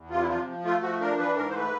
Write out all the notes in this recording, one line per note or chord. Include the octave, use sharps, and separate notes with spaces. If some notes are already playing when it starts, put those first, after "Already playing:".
Already playing: E2
C3 F4
E4
F3 F4
F3
A3 F4
F3 F#4
D4 A#4
E3 B4
G#2 A#4
C5
A3 B4